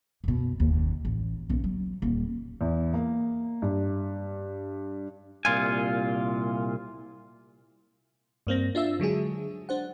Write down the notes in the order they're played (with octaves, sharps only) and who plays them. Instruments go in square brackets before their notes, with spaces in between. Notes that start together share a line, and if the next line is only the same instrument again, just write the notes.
[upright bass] F#2 B2
F#1 D#2
A1
B1 C#4
F#3
D#1
[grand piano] E2
A#3
G2
[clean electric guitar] C2 A#2 F4 G#5
[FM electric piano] G2 A#3 C4 A#6
D4 F4 E5 E6
D3 F#3 G#3 G#4
D4 C5 F#5